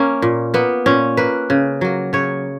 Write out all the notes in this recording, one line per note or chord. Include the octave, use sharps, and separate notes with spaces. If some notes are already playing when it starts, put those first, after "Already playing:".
Already playing: A#3 C#4
A#2
A#3 B3
A#2 C#4
A#3 B4
C#3
F#3 A#3
C#3 C#5